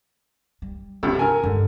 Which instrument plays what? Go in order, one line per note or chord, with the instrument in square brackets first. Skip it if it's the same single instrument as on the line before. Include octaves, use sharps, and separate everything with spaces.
[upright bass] G3
[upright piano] C#2 G2 C3 [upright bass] E3
[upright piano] A#4 G#5
[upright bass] G2 G#3 [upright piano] D3